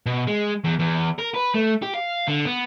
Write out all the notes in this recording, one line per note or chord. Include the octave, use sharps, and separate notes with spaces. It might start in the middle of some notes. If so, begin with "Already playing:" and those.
B2
G#3
E2
E2
A#4
B4
A3
G4
F5
D3
B3